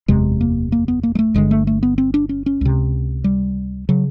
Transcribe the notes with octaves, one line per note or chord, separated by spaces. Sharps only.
F#1 E2 C3 G#3
A#3
A#3
B3
A#3
G#3
A3
G1 G2 D3 G#3
A3
A3
B3
C4
D4
C#4
C#4
C#2 C3
G3
C#3 F#3